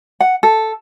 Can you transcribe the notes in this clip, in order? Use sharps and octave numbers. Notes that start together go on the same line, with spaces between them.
F#5
A4